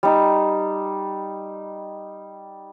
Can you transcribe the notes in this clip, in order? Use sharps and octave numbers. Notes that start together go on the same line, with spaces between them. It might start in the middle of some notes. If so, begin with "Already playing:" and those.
G3 D#4